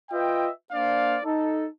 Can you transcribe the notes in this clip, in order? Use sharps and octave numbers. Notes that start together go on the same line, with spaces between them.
F4 B4 D#5 E5 G5
A#3 D4 C5 D5 F5
D#4 A4